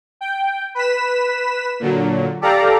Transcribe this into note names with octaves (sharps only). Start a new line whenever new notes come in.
G5
B4 B6 E7
A#2 D3 F#3
G4 A4 D5 F5 A#5